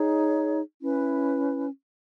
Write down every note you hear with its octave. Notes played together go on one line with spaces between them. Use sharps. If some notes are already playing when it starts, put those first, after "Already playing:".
Already playing: D#4 G#4 C#5
C#4 E4 B4